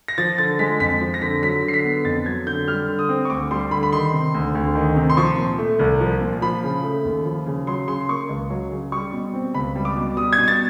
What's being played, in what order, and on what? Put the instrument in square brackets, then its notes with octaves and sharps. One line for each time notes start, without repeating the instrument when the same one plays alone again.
[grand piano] A#6
F3 A6
D3 A6
G#3 B6
F2 B6
F3
A#6
D3 B6
F#3 B6
D3 C7
B6
B3
F2 A6
F#3 G#6
D3 G6
G3 F6
D3
D#6
C4
C#6
D2 D6
G3 C6
D3 B5
B5
D#3 C6
C3
D2
D2
D#3
C3
C6
F3 C#6
A#2
A3
C2
F3
A#2
F3 B5
C#3
A3
D#2
F3
C#3
F#3 C6
C#3 C6
A#3 C#6
C#2
F#3
C#3
G3 C#6
B2
C4
C#2 B5
G3
D6
B2
G3 D#6
G#6
B2
A6